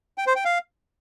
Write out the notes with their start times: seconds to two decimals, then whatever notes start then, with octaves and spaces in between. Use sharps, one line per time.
0.18 G5
0.27 C5
0.36 G5
0.45 F5